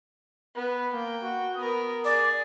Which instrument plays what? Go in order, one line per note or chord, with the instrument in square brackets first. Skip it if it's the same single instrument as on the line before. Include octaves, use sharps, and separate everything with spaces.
[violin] B3 [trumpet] B4
[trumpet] A#3 [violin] G5
[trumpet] F#4
[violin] B3 A#4 [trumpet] D#6
[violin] G#4 [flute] D5 [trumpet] D6